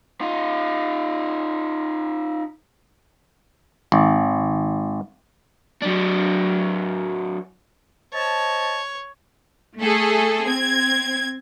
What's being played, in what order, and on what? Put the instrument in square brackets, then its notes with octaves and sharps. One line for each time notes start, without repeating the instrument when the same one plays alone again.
[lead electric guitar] D#4 F4
[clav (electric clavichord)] G#1
[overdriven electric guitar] F#3 D4
[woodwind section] C5 D#5 A5 [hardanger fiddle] C#5
[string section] A3 G#4 A4
C4 G#6